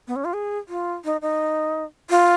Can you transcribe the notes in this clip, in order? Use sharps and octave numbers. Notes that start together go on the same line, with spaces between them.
B3
C#4
F4
G#4
F4
D#4
D#4
F4